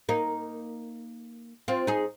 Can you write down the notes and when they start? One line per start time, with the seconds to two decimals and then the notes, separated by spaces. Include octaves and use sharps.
0.09 A#3 D#4
1.68 C4 F4
1.87 D#4 G#4